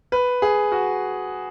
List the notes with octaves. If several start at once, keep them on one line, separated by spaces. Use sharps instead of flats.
B4
G#4
F#4